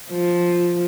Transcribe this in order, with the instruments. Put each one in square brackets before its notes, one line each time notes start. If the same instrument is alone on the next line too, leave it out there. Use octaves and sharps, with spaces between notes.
[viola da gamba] F3